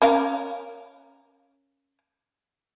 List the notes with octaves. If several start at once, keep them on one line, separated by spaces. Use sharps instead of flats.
C#4 A#4 F5